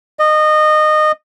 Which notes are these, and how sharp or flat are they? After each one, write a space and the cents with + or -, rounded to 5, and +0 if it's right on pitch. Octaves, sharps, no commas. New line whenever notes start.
D#5 -20